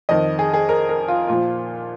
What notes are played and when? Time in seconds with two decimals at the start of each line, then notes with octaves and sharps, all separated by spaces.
0.09 F2 D#3 D#5
0.39 G#4
0.54 G#4
0.69 A#4
0.89 A#4
1.08 F4
1.28 A#2 F3 F4